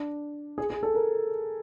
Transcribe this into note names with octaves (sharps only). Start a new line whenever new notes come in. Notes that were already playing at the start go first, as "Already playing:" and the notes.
Already playing: D4
G#4
G#4
A4
A#4